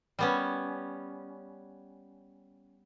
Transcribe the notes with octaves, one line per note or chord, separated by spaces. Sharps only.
G3 B3 C#4